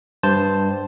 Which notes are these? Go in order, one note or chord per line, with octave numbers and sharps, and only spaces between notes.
G2 C5 A5